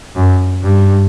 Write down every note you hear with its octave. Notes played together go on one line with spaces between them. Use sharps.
F#2
G2